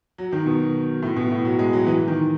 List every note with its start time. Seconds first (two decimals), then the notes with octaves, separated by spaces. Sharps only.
0.18 F#3
0.32 D#3
0.46 B2
1.02 A2
1.16 B2
1.31 A2
1.45 F#3
1.59 G#3
1.73 F#3
1.87 E3
2.08 D#3